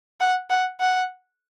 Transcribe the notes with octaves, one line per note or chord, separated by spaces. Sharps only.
F#5
F#5
F#5